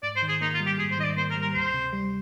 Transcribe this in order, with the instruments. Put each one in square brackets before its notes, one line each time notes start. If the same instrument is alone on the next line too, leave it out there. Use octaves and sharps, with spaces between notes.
[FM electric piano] G#2 [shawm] D5
[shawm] C5
[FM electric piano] D#3
[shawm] G#4
[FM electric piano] A#3 [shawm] D#4
[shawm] F4
[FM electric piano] G3
[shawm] G4
[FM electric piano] G#2 [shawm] G#4
[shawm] C5
[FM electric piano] D#3 [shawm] D#5
[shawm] D5
[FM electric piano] A#3 [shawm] C5
[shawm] A#4
[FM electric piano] G3
[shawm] A#4
[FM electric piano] D2 [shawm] C5
[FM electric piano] C3
G3